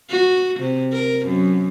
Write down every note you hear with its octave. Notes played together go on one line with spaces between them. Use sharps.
F#4
C3
A#4
F#2